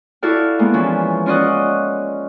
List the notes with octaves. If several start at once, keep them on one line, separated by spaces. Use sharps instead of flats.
E4 F#4 A4 D5 F5
G#3 A#3 B3
E3 F3 C#4
C#4 F4 D5 D#5 F#5